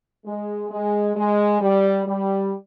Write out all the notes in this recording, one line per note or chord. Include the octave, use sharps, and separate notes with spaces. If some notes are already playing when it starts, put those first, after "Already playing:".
G#3
G#3
G#3
G3
G3